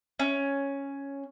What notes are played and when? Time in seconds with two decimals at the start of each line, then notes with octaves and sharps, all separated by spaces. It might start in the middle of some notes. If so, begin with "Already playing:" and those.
0.19 C#4